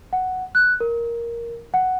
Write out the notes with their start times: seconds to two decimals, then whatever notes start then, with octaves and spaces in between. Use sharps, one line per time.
0.13 F#5
0.55 F#6
0.80 A#4
1.74 F#5